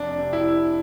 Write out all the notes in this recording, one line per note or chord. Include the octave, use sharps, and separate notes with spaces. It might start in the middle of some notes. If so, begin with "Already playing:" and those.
Already playing: F1 D4
C3
E4